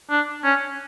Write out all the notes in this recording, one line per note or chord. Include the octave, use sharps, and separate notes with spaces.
D4
C#4